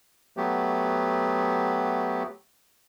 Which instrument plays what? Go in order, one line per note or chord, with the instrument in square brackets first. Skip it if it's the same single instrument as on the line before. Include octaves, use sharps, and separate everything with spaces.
[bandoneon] F#3 A3 B3 G4